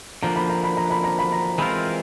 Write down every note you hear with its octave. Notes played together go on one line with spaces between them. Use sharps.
D3 F3 A#3 D4 A#5
B5
A#5
B5
A#5
B5
A#5
B5
A#5
E3 G#3 C4 F4 A#4 B5